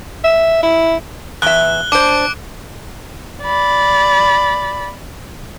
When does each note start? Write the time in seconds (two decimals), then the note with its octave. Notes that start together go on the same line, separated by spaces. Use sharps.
0.24 E5
0.63 E4
1.42 E2 E5 F#6 G7
1.92 D4 C5 D6 D7
3.43 D5 B5